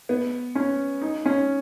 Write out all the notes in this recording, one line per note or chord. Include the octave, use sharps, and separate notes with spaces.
B3
C#4
D#4
C#4